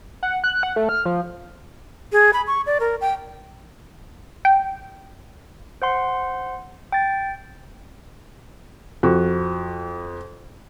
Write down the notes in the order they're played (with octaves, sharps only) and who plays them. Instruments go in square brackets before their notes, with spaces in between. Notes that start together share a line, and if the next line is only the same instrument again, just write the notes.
[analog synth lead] F#5
F#6
F#5
A3
F6
F3
[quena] G#4
B5
C#6
D5
A#4
G5
[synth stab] G5
[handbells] C5 F#5 C6
G5 A6
[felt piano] F2 F#4